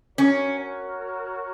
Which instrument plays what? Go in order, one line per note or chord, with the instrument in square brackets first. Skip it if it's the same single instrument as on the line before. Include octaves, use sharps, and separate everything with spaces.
[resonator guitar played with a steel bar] C#4 [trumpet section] F#4 A#4 C#5